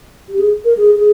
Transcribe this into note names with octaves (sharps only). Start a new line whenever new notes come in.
G4
G#4
A#4
G#4
G#4